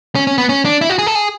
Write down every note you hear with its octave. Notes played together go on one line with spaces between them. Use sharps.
C#4
C#4
B3
C#4
D4
E4
F#4
G#4
A4
G#4